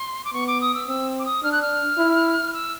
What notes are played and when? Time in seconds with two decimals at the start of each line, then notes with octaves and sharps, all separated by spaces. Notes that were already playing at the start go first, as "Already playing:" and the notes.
Already playing: C6
0.24 D6
0.33 B3 C#6
0.47 D6
0.61 D#6
0.74 E6
0.88 C4 E6
1.19 D6
1.25 D#6
1.43 D4 F6
1.52 F#6
1.62 F6
1.98 E4
2.53 E6